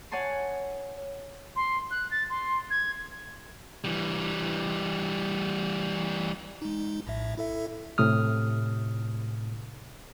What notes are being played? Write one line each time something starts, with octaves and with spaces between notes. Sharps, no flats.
C#5 F#5 G#5 A5 C6
C6
F#6
A6
C6
G#6
E3 G3
G#3 D#4
A#1 A2 E5
E4 A4 E5
A2 C3 D#6 F6